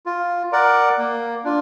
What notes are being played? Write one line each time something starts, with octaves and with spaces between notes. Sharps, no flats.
F4
A#4 D5 F#5
A#3
D4 F4